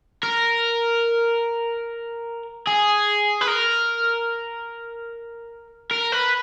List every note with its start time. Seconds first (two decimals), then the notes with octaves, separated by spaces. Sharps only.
0.23 A#4
2.67 G#4
3.41 B4
3.48 A#4
5.91 A#4
6.12 B4